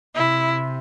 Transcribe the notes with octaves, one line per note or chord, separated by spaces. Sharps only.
C3 E4